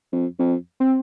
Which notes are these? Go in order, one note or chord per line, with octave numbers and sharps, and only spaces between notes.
F2
F2
C4